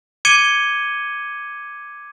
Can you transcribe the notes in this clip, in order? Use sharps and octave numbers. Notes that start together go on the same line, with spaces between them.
D6 G#6 C#7 D#7 G7